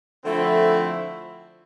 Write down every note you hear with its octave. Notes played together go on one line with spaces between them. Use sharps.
D3 F3 A3 C4 E4